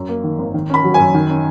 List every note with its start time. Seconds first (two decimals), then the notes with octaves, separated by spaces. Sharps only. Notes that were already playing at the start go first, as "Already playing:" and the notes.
Already playing: F#2
0.09 A#3
0.24 D#3
0.39 G#1
0.54 D#3
0.70 C#4 B5
0.84 F#3
0.94 G#5
0.99 F#2
1.14 D#3
1.30 C#4